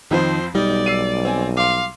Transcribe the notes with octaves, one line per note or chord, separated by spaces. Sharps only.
F2 D#3 F3 C4 C5
B1 G3 D#4 D5
E6 C7 D#7
C4 G#5
F5 C6 D6